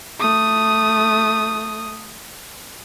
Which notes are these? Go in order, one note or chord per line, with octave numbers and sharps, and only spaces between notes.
A3 D#6